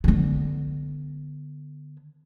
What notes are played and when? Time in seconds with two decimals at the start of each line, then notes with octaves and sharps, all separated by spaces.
0.04 D3 B3